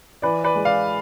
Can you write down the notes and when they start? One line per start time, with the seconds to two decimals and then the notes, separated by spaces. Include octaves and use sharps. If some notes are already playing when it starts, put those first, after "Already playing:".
0.22 E3 B4 D5
0.44 B4 D5
0.55 G#3
0.65 D5 F5